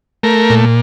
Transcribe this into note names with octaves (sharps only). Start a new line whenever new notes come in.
A3 A#4
A#2